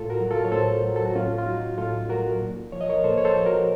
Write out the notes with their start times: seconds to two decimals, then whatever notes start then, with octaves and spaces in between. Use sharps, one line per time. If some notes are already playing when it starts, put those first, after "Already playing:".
Already playing: A2 F4 A4
0.10 F#4 A#4
0.20 F#3
0.31 F4 A4
0.44 C#5
0.52 A2 A4 C5
0.84 F#3
0.96 A4
1.06 F#4
1.15 A2 C#4 F4
1.38 F4
1.46 F#3 D#4 F#4
1.78 A2 F4 A4
2.09 F#3 F#4 A#4
2.41 A#2
2.72 F3 C#5
2.81 D#5
2.89 A#4 C#5
3.04 A#2 A4 C5
3.18 C#5
3.25 A4 C5
3.36 F3
3.46 F#4 A#4